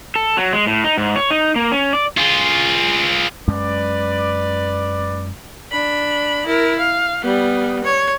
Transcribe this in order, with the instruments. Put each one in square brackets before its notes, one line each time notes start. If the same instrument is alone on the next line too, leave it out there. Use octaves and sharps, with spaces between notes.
[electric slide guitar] A4
F#3
G#3
A2
D#4
G#2
C#5
D#4
A#3
C#4
D5
[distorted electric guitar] F4 G#4
[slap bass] F#2 G#3 C#4 [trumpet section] B4 D5
[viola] D4 B5
E4 A#4
F5
G3 B3
C#5